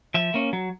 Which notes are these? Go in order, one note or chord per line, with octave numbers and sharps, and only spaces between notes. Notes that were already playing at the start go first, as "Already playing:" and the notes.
F3 E5
A#3 C#4
F#3